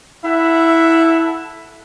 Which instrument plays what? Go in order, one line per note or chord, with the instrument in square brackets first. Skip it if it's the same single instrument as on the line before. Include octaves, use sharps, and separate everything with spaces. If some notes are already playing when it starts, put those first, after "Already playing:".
[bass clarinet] E4 [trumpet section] A4 E5 F#5